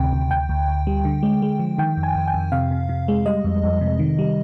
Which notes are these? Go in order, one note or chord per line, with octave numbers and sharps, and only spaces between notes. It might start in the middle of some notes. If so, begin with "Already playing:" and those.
Already playing: D2 C3 D#3 G5
D2
D2 G5
D2
D2
G3
D3
G#3
G#3
F3
D#3 G5
F2
G#5
F2
G5
F2
C3 F5
C3
C3
G#3
G3 D#5
F2
F2
C3
D#3
G3